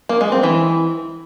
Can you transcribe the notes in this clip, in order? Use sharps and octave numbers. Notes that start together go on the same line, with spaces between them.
A#3
G#3
C4
E3